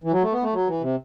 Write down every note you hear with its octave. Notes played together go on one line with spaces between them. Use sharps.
E3
F#3
A3
B3
A3
F#3
E3
C3